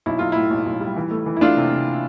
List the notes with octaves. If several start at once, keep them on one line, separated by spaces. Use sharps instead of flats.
B1 E4
B1 F4
A2 E4
B1
B1
G3
E3
A3
E3
E4
A3 D4 F4
C3
C3